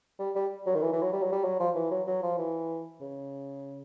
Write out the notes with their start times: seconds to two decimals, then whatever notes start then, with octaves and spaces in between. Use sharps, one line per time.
0.19 G3
0.35 G3
0.67 F#3
0.75 D#3
0.82 E3
0.93 E3
1.02 F#3
1.13 G3
1.23 F#3
1.32 G3
1.44 F#3
1.60 F3
1.75 E3
1.91 F#3
2.07 F#3
2.22 F3
2.38 E3
3.01 C#3